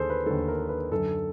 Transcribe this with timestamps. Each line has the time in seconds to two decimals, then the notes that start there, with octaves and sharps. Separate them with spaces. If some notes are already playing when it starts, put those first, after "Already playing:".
Already playing: D#2 D3 G#4 A4 C5
0.10 B4
0.26 D#2 D3 A4
0.48 A#4
0.69 B4
0.91 F#2 D3 A4